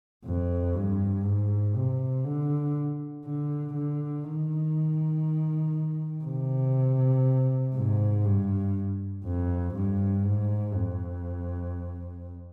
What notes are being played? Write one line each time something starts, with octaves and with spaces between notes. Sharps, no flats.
F2
G2
G#2
C3
D3
D3
D3
D#3
C3
G#2
G2
F2
G2
G#2
F2